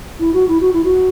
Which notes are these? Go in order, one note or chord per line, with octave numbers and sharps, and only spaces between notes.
E4
F#4
E4
F#4
E4
F#4